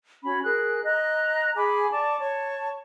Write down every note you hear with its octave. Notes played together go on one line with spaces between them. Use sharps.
C#4 F#4 B5
G#4 A#4 F#6
D#5 A#5 F#6
G#4 G#5 B5 D6
D5 A5 C#6 D6
C#5 A5 C#6